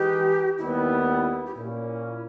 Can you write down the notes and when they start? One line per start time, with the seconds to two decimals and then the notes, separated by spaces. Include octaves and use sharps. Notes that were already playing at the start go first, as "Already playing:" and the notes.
Already playing: E3 G#3 D#4 G4 G#4 B4
0.59 D#2 D#3 G3 B3 E4
1.46 G4
1.55 A#2 A#3 C#4 E4